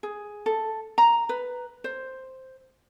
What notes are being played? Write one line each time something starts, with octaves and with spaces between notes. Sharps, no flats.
G#4
A4
A#5
B4
C5